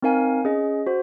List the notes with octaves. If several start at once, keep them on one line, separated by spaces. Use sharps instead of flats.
C4 D#4 A#4 F5 G#5
C#4 G#4 D#5
F#4 C5